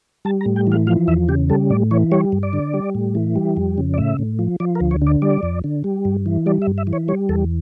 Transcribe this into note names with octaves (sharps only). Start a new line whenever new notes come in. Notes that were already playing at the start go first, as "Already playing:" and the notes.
G3 A5
A#5
A2
G5
E3 F5
F3 F5
E2 E5
C#3 G4
G3 A4
A2 D5
E3 C#5
G3 C#5
G2
D5
D3
G3
A2
E3
G3
F2
C#3
D5
A2 E5
A2
F3
F3 D5
A#4
D2
C#5
D3 D5
G3 D5
F2
D3
G3
G2
E3
G3 D5
E5
G2
E5
E3
C#5
G3 C#5
E2 A4